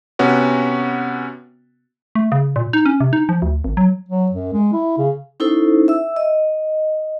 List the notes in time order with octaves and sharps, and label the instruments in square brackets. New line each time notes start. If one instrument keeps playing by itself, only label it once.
[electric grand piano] C3 B3 C#4 F#4
[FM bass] A3
C#3
A#2
D#4
C#4
C3
D#4
F3
D2
G#1
F#3
[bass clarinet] F#3
F#2
G#3
E4
C#3
[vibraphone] C#4 D#4 E4 A4 C5
E5 E6
D#5